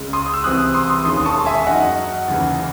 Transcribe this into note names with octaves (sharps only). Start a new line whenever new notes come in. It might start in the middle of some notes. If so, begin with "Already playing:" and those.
Already playing: C#2 C#3 G#3
C6 D#6
E6
C2 C3 E3 C4 D#6 F#6
C6 D#6
C6 D#6
E1 D#2 D#3 G#3 C#4 C6 D#6
D#6
A5 C#6
E5 G#5
F#2 D#3 F#3 D#5 F#5
D#2 C#3 E3